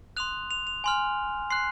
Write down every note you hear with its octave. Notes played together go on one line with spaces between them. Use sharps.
C6 D#6 F#6 F7
F7
F7
G#5 C6 F6
C6 F#6 C7